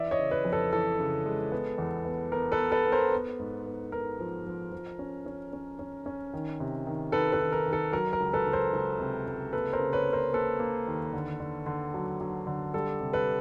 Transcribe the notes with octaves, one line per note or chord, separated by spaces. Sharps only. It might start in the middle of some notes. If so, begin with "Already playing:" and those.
Already playing: E3 D5 E5
C#5 D#5
C#3
B4 C#5
F2
A4 B4
E3 A4
C#3
G#3
B3
E2
B3
B3 A#4
A4 B4
B3
A4 B4
B3
A#4 C5
B3
G#2
B3
B3 A#4
F3
F3
F3
C#4
C#4
C#4
C#4
C#4
D#3
C3
D#3
D#3 A4 B4
A4 B4
D#3
A#4
D#3
A4
F#3 A#4
A#4
C#2
A4 B4
C#2
A#4 C5
C#2
C3
C#2
A#3 A4 B4
A#4 C5
C#3
B4 C#5
A#3
A#4 C5
A#3 A4 B4
A#3
D#2
D3
D3
D3
F#3
F#3
D3
G3 A4
C3
A4 B4